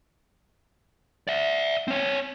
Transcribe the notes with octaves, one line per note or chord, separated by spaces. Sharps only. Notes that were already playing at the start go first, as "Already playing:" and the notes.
D5 E5
C4 C#5